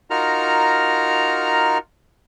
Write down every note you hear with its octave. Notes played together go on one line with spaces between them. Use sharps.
D#4 F4 F#4 A#4 A#5 F6